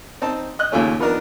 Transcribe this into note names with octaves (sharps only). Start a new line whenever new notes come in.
C4 D#4 A5
D#5 F#6
D#2 A#2 C#3 A3 C#4
F3 B3 D4 D#4 A#4